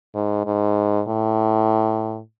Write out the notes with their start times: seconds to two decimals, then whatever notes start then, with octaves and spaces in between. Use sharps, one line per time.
0.14 G#2
0.45 G#2
1.08 A2